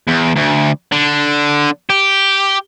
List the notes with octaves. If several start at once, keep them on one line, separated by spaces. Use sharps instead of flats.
E2
D2
D3
G4